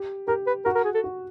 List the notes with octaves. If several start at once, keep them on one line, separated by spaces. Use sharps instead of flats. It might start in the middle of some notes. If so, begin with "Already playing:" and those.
Already playing: G4
G4 A#4
B4
F#4 A#4
A#4
G#4
A4
F#4